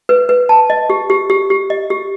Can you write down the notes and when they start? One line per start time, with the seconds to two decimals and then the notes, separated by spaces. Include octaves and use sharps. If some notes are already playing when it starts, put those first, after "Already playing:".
0.09 B4
0.29 B4
0.49 A5
0.70 D#5
0.90 G4
1.10 G4
1.30 G4
1.50 G4
1.70 D#5
1.90 G4